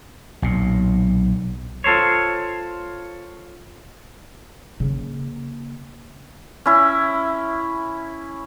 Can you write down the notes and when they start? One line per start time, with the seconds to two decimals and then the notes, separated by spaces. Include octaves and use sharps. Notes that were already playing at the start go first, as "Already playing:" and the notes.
0.42 B1 A#2
1.84 F4 A4 C5 C#5
4.80 C#3 A#3
6.66 C#4 E4